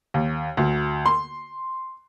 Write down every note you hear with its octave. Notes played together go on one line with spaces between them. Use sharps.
D#2
D2
C6